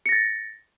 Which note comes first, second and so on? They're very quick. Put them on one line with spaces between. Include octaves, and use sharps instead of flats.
C#7 A#6 A6